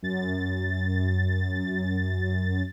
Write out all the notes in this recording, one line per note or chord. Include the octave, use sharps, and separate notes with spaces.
F#2 A6